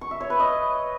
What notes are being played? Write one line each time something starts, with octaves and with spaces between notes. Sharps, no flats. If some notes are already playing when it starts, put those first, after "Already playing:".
C#6
E5
C#5
B4
D#5